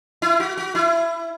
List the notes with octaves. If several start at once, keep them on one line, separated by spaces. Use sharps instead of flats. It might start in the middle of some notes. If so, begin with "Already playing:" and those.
E4
F#4
F#4
E4